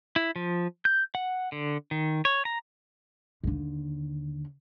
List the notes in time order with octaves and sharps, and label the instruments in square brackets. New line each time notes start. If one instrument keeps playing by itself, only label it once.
[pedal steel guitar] E4
F3
G6
F#5
D3
D#3
C#5
A#5
[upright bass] D#2 D3